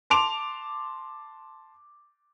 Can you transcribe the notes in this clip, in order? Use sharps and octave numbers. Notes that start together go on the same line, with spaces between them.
A5 C6 D6 D7 F7